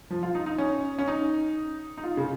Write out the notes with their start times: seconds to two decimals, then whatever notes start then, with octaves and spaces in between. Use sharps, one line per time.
0.10 F3
0.23 F4
0.35 D#4
0.46 D#4
0.58 C#4
0.98 C#4
1.08 D#4
1.98 D#4
2.04 F4
2.17 C#3